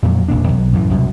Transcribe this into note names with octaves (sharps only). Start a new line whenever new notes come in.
F2 A#2 F#3
D#1 C2 A#2 D4
B1 E2 F#3
F#2 A2 C#3 E3
C2 F#2 B2